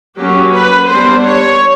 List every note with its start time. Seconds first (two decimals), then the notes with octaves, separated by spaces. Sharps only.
0.18 F#3 A#3 C#4 G4
0.54 B4
0.89 G3 B3 D4 C5
1.26 C#5